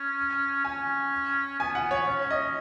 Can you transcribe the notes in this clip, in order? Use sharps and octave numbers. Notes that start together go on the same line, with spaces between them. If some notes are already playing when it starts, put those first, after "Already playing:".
Already playing: C#4
C#4 G#5
B3 G#5
F#5
C#5
C#4 C#5
D#5